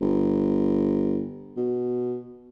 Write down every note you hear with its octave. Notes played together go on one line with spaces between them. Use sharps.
G1
B2